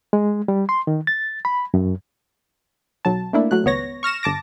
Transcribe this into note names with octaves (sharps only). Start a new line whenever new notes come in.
G#3
G3
C6
D#3
A6
B5
F#2
B1 F#3 A5
A3 A#3 D4 E4
F#3 A3 F#6
G#1 C#2 B3 C#5 A#6
C#6 F6 A#6 E7
G1 A5 D6 A#6